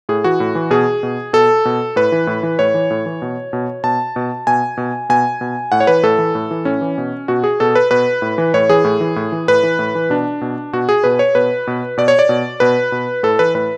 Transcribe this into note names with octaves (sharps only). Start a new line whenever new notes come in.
A2 G#4
E3 F#4
A2
E3
B2 G#4
B2
B2 A4
B2
A2 B4
E3
A2
E3
A2 C#5
E3
A2
E3
B2
B2
B2 A5
B2
B2 G#5
B2
B2 G#5
B2
A2 F#5
C#5
E3 B4
A2 A4
E3
A2
E3
A2 C#4
E3
B2
B2 F#4
G#4
B2 A4
B4
B2 B4
A2
E3
A2 C#5
E3 G#4
A2
E3
A2
E3
A2 B4
E3
A2
E3
B2 D4
B2
B2 F#4
G#4
B2 B4
C#5
B2 B4
B2
B2 D5
C#5
D5
B2
B2 B4
B2
A2 A4
E3 B4
A2 B4